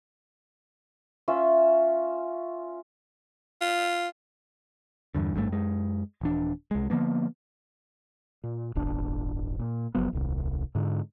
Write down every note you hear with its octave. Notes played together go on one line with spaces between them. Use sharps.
C#4 F4 E5
F4
E2 G2 D3
G#1 G2 C3 A3
F#2 G#3
D#1 E3 D4
C2 G#3
D3 F3 A#3 B3
A#2
D1 G1 D4
A#2
F#1 F3 F#3 B3
D#1 C2
G#2 D3